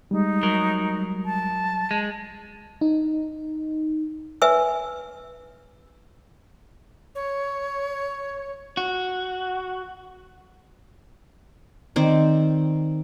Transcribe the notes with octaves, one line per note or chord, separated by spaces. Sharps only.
G3 G#3 D#4
F#3 A#4
A5
G#3
D#4
B4 E5 G#5 E6
C#5
F#4
D#3 C4 C5 D5